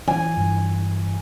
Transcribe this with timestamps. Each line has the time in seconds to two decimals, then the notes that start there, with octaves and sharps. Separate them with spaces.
0.08 E3 F3 G#5
0.37 G2 E3